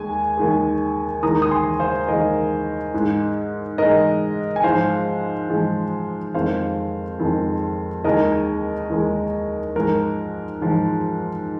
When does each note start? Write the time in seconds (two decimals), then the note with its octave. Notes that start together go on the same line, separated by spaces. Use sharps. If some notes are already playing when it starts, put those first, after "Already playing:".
Already playing: D#2 G#3 G#5
0.37 D#2 D#3 G#3
1.23 D#2 D#3 G#3 A#5 D#6
1.42 D#6
1.51 G#5 C6
1.79 C5 F5
2.08 D#2 D#3 G#3 A#4 D#5
2.94 G#2 G#3
3.78 G#2 G#3 A#4 D#5
4.56 G#5
4.63 G#2 F3 G#3 C5 F5
5.50 G#2 F3 G#3
6.34 F2 D#3 G#3 C5 F5
7.19 F2 D#3 G#3
8.04 D#2 D#3 G#3 A#4 D#5
8.90 D#2 D#3 G#3
9.76 G#2 F3 G#3 A#4
10.61 G#2 F3 G#3